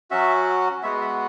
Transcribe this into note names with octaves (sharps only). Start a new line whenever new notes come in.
F#3 C#4 F#4 E5
G#3 B3 F#4 E5
E5